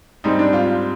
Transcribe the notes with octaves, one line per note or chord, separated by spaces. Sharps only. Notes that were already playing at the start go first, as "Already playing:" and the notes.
G#2 G3 C4 D#4
D4
F4